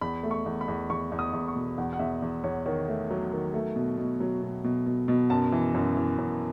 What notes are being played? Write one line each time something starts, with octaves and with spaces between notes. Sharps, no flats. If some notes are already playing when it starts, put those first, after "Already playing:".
E2 B5
A3
C#6
E2
B5
E2
E2 C#6
E2
D#6
E2
C#6
B2
E2 F#5
F#5
E2 E5
E2
E2 C#5
D#3 C#5
A3
F#3
D#3
A3
B2
B2
F#3
B2
B2
B2
B2
F#2 A5
E3
F#2
E3
F#2